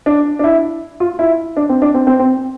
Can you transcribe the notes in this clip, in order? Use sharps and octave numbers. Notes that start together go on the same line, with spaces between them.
D4
D4
E4
F4
E4
D4
C4
D4
C4
C4
C4